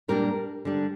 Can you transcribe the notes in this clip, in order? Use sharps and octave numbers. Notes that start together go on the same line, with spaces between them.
A#2 G3 A#3 D4 A#4
D3 G3 D4